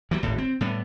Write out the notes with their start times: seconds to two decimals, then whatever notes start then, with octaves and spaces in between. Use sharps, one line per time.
0.11 E3 F#3 G3
0.23 D1 G#1 A2
0.38 C4
0.61 A2 G3 B3